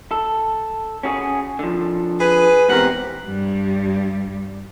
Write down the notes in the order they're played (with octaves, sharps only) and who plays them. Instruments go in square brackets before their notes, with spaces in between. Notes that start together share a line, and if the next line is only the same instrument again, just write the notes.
[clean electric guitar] A4
C#4 F#4 G#4
D3 F3
[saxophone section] G#4 B4
[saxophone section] E2 A#4 F#5 [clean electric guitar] G#2 C4 G4
[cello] G2 G3